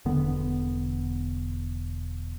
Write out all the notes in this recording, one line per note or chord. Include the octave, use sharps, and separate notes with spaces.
E1 D3 B3